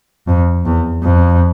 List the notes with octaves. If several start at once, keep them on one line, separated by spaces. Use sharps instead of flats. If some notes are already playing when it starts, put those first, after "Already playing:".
F2
E2
F2